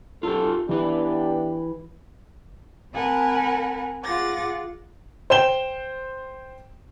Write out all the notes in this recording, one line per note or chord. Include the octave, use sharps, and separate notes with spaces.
B1 F#2 F4 G4 A4
E3 B3 D4 E4 G4 B4
C4 A#4 F#5 G#5 A5 B5
F4 G#4 F#5 D6 A6 A#6
C5 G5 E7 G7